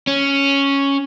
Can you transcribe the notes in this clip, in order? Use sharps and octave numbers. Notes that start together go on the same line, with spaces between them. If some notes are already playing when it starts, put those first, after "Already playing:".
C#4